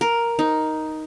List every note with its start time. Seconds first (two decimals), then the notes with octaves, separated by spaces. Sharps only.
0.01 A#4
0.39 D#4